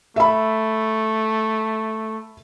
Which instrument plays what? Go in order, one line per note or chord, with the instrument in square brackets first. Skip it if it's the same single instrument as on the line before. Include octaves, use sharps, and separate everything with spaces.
[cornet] A3 [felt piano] E5 B5